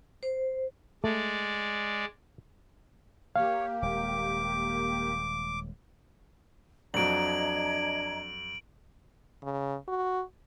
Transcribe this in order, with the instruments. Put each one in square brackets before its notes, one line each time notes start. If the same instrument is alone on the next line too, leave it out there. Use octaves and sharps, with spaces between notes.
[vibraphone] C5
[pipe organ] G#3 D5 [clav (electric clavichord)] A3
[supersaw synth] A#3 G4 [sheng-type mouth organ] C#5 [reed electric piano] F5
[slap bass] D#1 G#3 [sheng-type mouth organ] D6
[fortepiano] F2 F#3 [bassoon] D4 [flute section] D#5 A#5 G#6 [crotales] D7 F#7
[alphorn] C#3
F#4